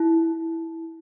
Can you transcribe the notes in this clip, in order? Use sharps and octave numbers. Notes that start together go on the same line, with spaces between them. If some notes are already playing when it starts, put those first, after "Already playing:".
Already playing: E4